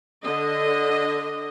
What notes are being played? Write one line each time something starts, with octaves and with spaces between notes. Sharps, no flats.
D3 D#5